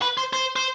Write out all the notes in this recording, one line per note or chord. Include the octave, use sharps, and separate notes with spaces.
B4
C5
C5
C5